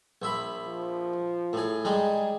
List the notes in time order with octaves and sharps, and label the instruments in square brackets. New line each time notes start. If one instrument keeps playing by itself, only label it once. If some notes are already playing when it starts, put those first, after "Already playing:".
[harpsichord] A#1 E5 B5
[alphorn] F3
[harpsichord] A2 G#4
[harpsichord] G3 G#3 D#4 [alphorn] G#4